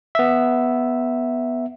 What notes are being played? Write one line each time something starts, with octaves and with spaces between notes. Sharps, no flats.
B3 E5